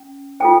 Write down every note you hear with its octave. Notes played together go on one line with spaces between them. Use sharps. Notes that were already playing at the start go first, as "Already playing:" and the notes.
Already playing: C#4
F4 A4 C5 G5